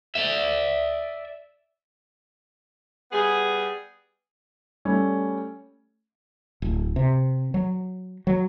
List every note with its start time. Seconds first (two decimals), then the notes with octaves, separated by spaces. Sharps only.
0.16 D5 E5
3.12 G3 B3 G#4
4.85 G3 A3 C#4
6.62 D1
6.96 C3
7.54 F#3
8.27 F#3